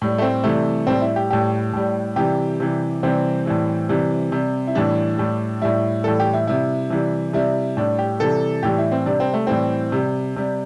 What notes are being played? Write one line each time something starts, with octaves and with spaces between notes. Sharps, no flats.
A2 G3
A3
C4
C3 E3 G3 A3
A2 G3 C4
E4
G4
A2 G3 G4
A2 G3
C3 E3 G3 G4
C3 E3 G3
C3 E3 G3 C4
A2 E3 G3
C3 E3 G3
C3 G3
E4
A2 E3 G3 D4
A2 G3
A2 G3 E4
A2 E3 G3 A4
G4
E4
C3 G3 E4
C3 E3 G3
C3 G3 E4
A2 G3 D4
G4
C3 E3 G3 A4
A2 E3 G3 G4
E4
C4
C3 G3 D4
C4
A3
A2 E3 G3 C4
C3 G3
C3 G3